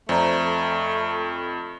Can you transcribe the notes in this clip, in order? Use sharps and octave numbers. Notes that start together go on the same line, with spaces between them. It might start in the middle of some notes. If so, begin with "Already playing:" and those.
F2 A3 C5 D5 A#5